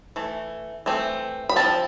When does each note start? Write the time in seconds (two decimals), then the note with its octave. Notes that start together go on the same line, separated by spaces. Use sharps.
0.16 E3 A3
0.86 E3 A3 C4
1.49 B5
1.56 F3 C4 A5